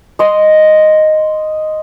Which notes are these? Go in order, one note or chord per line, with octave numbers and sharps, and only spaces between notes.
D#5 C6